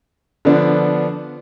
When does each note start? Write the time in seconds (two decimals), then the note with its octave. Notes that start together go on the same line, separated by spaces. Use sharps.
0.45 D3 F3 B3 D4